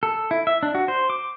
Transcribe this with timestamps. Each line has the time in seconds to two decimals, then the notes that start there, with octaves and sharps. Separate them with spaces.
0.03 A4
0.31 E4
0.47 E5
0.63 D4
0.75 F#4
0.88 C5
1.10 D6